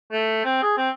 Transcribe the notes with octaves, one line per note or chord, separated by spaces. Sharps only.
A3
C4
G#4
C4